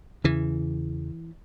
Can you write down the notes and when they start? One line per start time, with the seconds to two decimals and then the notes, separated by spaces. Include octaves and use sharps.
0.24 E2 C#3 E3